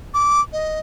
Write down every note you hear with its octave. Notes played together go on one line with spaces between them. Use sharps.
D6
D#5